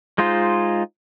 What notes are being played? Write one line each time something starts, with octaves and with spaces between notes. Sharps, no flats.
G#3 D#4 F4 C5